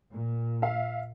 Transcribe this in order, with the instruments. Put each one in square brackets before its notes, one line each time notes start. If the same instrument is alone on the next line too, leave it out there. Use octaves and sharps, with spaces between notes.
[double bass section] A#2
[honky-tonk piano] E5 F5